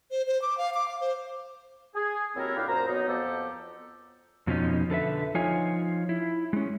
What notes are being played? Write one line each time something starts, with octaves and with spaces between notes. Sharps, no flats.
C5
C5
D6
F5
D6
F5
C5
G#4
D#2 F#3 C4 E4 A4 A#4
A#2 D3 E4 G4 B4 F5
F#2 A#2 C5 A#5
B2 F#3 B3 D#4
F2 F3 B3 G4 A4
F2 B2 F3 C#4 D#4
D3 A4 B4 E5
F3 D#4 F4 C#5 G#5
E4
G#3 C#4